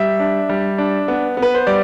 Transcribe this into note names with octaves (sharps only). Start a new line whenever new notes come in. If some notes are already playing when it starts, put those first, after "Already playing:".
Already playing: G3 E5
D4
G3
D4
B3
B3
B4
C5
G3 D5